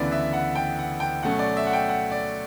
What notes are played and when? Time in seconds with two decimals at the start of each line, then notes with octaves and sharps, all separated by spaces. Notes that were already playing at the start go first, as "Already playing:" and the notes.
Already playing: D2 C#3 E3 B3 D5
0.12 E5
0.33 F#5
0.55 G5
0.79 F#5
1.00 G5
1.23 B2 F#3 A3 C#4 F#5
1.39 D5
1.57 E5
1.67 F#5
1.73 G5
1.89 F#5
2.11 D5